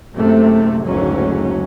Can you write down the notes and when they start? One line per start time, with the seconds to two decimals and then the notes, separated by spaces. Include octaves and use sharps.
0.13 F#1 C3 A3
0.86 F#1 D2 G#2 F#3 C#4